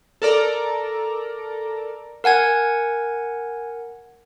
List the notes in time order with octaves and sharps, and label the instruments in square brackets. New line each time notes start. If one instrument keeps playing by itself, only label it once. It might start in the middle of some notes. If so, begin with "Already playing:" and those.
[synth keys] A4 A#4 D5 A#5
[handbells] A#4 F#5 G#5 G#6